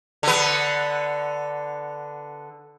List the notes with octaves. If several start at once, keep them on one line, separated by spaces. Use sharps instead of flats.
D3 B3